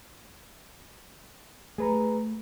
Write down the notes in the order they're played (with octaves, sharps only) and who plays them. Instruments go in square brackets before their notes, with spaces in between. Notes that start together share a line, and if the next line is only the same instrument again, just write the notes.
[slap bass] A3 [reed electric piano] G#4 B4 A#5